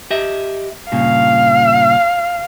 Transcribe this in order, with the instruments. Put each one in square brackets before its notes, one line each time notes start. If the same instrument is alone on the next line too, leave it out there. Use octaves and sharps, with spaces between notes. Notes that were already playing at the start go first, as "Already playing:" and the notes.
[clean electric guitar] G4 D#5 E5
[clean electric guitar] G2 A#2 C#3 [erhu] F5